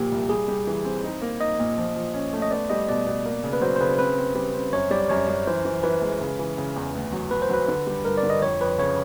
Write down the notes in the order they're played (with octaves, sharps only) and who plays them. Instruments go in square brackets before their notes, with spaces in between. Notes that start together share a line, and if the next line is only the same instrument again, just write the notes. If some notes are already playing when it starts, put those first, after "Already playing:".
Already playing: [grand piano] A#2 F3 A#3 [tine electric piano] G4
[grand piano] C2
[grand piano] G3 [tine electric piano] G#4
[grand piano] G3
E3
C4
D#4
A#3
[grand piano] D#4 [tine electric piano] D#5
[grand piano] A#2
F3
F3
C#4
A3
[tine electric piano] D#5
[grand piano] B3 [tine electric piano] D5
[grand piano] G3 [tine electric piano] D#5
[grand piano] B2 [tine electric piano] D5
[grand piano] B2
A#3
C#3
[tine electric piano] B4
[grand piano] F#3 [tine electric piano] C5
[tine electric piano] C5
[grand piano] C#3 [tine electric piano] B4
[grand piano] C4 [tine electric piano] B4
[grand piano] C4
G3
C4
[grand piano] F#2 [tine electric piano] C#5
[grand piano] G3 [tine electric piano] D5
[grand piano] F#2 [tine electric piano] C#5
[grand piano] F#2
[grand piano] E3 [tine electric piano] C5
[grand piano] E3
[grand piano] E3 [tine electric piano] B4
[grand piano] G#3
C#3
E3
C#3
E2
D2
F#3
[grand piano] F#3 [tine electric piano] B4
[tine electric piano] C5
[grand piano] F#3 [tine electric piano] B4
[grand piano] D3
G3
[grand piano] G2 [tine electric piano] A#4
[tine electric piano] D5
[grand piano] D3
[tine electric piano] D#5
[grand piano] F2 [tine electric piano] C#5
[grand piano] F2 [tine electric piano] B4
[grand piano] C#3 [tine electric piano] C#5